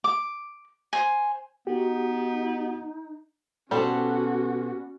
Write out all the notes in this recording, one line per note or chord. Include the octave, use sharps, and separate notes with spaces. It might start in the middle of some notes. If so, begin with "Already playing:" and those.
D6
C5 G#5
B3 D#4 F#4 G4
B2 G3 C#4 F#4 A4 C5 F#5